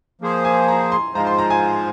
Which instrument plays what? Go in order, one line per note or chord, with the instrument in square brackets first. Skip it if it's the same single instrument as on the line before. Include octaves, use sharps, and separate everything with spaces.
[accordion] F3 A#3 G#4 C5
[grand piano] G#5
A#5
C6
[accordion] G#2 F3 G#3 F4 C5 [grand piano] A#5
[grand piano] C6
A#5
G#5